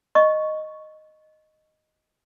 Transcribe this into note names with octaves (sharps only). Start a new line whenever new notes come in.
D#5 C#6